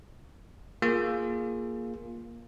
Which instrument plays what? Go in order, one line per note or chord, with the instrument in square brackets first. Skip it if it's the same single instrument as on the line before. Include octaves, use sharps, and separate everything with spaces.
[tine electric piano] A#3 F4 G#4